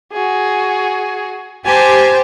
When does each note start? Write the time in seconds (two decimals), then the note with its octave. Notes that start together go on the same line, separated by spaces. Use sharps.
0.13 F#4 G#4
1.65 G4 C5 G#5 A5